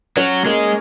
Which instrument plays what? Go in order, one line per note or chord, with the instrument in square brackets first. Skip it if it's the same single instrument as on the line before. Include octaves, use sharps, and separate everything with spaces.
[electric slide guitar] F#3 [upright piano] C#4
[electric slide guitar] G#3 [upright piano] A#3